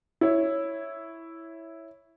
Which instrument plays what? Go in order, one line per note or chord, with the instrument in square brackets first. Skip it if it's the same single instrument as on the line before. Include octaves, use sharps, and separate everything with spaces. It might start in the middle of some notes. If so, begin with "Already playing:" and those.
[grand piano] E4 C#5